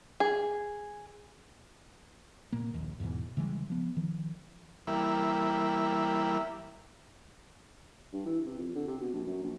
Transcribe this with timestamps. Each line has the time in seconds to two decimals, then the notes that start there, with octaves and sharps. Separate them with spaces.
0.20 G#4
2.53 A#2 A#3
2.74 A#1 D#2
3.00 E2 G#2 B2 E3
3.37 C#3 E3 G3 G#3
3.70 F3 B3
3.96 D#3 F3
4.87 E3 G3 A#3 E4
8.13 G2
8.26 E3
8.45 C3
8.58 F2
8.75 D3
8.87 C3
9.01 B2
9.14 A#1
9.27 F#2
9.43 A#1